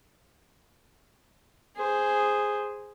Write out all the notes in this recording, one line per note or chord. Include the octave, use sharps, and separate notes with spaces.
G#4 C5